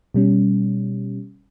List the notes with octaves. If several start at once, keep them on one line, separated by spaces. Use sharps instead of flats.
B2 G3 C#4